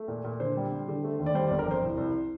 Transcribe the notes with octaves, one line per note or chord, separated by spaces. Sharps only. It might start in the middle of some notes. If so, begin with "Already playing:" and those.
Already playing: A3
A#2
A#2
D3 C5
G3
G3
D3
A3
D#2
D5
G3 C5
G1 D5
A#4
F2 C5
C2
C2